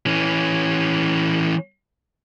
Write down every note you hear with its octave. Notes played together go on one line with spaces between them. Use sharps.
E3 C#4